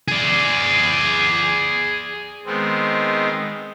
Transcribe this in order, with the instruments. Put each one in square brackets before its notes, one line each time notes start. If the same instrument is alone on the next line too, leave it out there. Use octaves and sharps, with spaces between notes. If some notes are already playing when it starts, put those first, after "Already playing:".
[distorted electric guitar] G#4 D5
[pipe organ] D#3 G#3 B3 C4